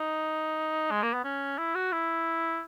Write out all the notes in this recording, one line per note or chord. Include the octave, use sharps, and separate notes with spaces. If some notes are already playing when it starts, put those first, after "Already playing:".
Already playing: D#4
G#3
A#3
B3
C#4
E4
F#4
E4